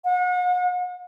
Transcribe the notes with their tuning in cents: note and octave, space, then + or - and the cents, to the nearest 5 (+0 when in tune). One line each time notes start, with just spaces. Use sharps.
F#5 -40